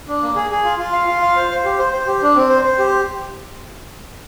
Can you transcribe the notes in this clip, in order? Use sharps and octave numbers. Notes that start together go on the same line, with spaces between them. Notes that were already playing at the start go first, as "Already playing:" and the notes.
D4
A#3
G#4
G#4
F4
F4
F5
F4
F5
C5
C5
G4
C5
C5
G4
D4
C4
C5
C5
G4